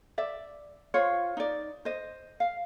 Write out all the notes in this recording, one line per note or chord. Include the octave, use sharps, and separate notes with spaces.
D5 E5
F4 C5 C#5
D#4 D5
C5 D#5
F5